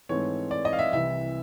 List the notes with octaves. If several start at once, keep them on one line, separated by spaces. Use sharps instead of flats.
G#2 E3 A3 C4 C#5
D5
D#5
F5
E5
C2 C3 E3 E5